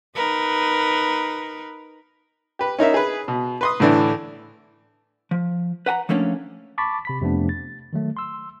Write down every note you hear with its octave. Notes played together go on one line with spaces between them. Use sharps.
D#4 A#4 B4
G4 B4
C#4 D#4 A#4 E5
G#4 B4
B2
B4 C6 D#6
A2 D3 E3 D4
F3
B4 F#5 G#5 A#5
F3 A3 A#3 C#4 D4
A5 B5 C#6 D6 A6 B6
C3 B5 B6
F2 C3 F3 A3 B3 D4
A6
D#3 F#3 A3
C6 E6